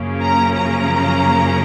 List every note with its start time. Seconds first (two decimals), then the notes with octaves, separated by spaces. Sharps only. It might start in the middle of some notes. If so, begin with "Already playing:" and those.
Already playing: F#2 C#3 F3 A#3 C#4
0.20 A#5
0.56 A#5